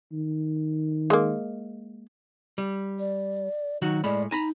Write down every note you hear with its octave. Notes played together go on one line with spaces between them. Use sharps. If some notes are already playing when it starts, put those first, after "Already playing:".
D#3
G#3 A#3
G3
D5
D#3 F#3 D#4 F#4
A2 G#3 D5 B5
D#4 G#5 A#5 B5